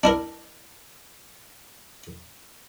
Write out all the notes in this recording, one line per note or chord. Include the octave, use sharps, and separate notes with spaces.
D4 E4 A#4